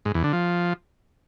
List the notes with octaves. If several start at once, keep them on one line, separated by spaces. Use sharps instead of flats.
G#2
E2
D3
F3